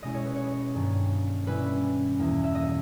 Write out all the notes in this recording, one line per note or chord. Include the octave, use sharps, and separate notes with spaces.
B2 G#3 C#4 E4 D#5
C#5
B4
C#5
G2 D#3 A#3 C#4
B2 G3 C#4 E4 B4
E2 B2 A#3 E4
E5
D#5